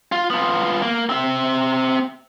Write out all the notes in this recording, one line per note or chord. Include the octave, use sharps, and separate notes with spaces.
F4
B3 F4
A#3
C4 E5